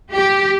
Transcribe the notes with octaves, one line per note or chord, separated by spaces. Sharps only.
G4